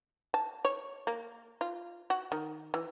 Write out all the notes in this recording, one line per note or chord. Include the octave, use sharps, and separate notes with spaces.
A5
C#5
A#3
F4
F#4
D#3
E3